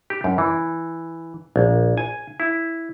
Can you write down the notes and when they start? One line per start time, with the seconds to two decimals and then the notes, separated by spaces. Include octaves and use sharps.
0.10 G4
0.24 F#2
0.38 E3
1.56 A#1
1.97 G#5
2.40 E4